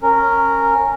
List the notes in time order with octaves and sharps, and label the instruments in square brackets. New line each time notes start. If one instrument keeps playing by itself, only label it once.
[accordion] C#4 A#4